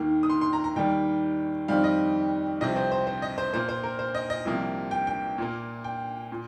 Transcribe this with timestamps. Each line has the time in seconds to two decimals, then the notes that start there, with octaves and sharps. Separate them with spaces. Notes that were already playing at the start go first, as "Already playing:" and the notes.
Already playing: D#2 D#3 A#3
0.23 D#6
0.30 C6
0.41 C6
0.53 A#5
0.64 A#5
0.76 D#2 D#3 G3 A#3 G5
1.68 F2 D#3 G3 C4 F5
1.84 D#5
2.61 C2 C3 F3 C4 D#5
2.76 C5
2.92 C5
3.07 C5
3.22 D#5
3.38 C5
3.53 A#2 A#3 C5
3.69 C5
3.84 A#4
3.99 C5
4.15 D#5
4.30 D#5
4.45 C2 C3 F3 A#3
4.91 G5
5.07 G5
5.38 A#2 A#3
5.84 G5
6.32 A#2